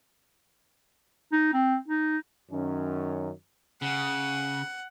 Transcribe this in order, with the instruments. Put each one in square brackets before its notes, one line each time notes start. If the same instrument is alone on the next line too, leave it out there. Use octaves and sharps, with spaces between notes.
[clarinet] D#4
C4
D#4
[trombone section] F#2 D#3 C#4
[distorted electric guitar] C#3 [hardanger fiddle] F#5